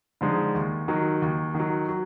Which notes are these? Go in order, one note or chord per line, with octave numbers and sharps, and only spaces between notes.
D3 F3 G#3 D#4
D#2
D#3 F#3
D#2
D#3
F#3
F#3